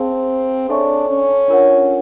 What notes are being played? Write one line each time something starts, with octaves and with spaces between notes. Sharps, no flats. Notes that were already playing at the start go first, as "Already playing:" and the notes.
Already playing: C4 G#4 C5 F5 A5
D4 A4 C#5 E5 G#5 C#6
C#4
D4 F4 A#4 C#5 F#5